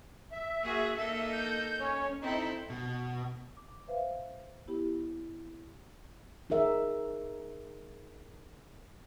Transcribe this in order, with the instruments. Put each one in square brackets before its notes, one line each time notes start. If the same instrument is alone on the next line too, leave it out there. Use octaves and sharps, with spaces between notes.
[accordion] E5
[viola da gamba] A#3 F#4 G#4
A#3 D#4 A4
[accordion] G6
C#4 C#5
[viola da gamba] C4 E4 A4 [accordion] D#4
[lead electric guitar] B2
[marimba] D6
B4 C5 E5 F5
B3 E4 G4
[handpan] D#4 G#4 A#4 E5